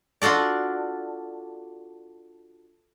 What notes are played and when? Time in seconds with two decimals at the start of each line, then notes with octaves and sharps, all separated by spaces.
0.22 D4 F4 F#4 A4 D5